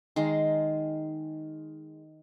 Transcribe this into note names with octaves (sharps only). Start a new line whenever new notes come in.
D#3 G#3 A#5 C6